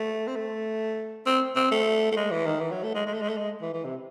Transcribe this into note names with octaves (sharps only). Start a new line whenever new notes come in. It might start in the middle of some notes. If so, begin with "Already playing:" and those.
Already playing: A3
C4
A3
C4
C4
A3
A3
G#3
E3
D#3
E3
F#3
A3
G#3
G#3
A3
G#3
A3
G#3
E3
E3
C3